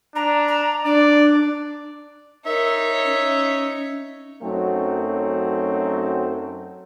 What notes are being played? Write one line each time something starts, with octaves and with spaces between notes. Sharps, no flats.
D4 A#5
A#5
D4 D5
D#4 A#4 C#5 E5
C#4
F#2 F#3 A3 C4 C#4 D#4